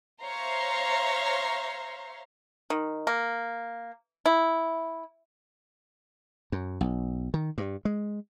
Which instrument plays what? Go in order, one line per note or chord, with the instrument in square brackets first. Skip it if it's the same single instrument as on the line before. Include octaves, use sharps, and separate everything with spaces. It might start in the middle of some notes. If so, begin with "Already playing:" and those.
[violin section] C5 C#5 E5 F5 A#5 C6
[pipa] D#3
A#3
E4
[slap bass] F#2
B1
D#3
G2
G#3